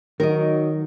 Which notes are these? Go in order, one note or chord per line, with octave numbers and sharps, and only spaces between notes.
D#3 F#3 D#4 A#4 D#5